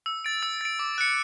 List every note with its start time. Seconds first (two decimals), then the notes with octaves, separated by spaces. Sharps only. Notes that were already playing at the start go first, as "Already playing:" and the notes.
0.06 E6
0.24 A6 D7
0.43 E6
0.61 A6 D7
0.79 D6
0.98 F#6 C#7